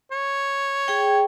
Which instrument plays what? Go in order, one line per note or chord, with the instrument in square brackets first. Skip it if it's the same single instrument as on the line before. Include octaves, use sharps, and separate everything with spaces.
[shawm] C#5
[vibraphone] G#4 G5